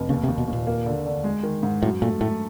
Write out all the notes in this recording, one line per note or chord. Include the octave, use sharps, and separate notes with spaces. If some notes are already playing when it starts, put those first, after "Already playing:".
Already playing: F1
D#2 C#3
C3
D#2
B2
D#2
A#2
A#3
D3
D3
G#3
D#3
G#2
F#2 A2
A#2 A3
A2 A3